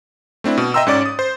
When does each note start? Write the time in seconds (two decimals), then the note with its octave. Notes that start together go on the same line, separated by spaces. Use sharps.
0.44 A3 C4 D4 E4
0.57 B2
0.74 D#5 E5 G5 A#5 C6 E6
0.87 G#2 C#4 D5 D6 A6
1.06 D#6
1.19 C5